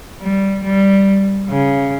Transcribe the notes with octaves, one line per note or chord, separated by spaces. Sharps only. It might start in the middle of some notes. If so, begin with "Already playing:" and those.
G3
G3
C#3